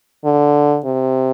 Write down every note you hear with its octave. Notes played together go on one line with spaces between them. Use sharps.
D3
C3